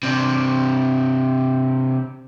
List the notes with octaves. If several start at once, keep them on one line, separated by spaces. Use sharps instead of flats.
C3 D4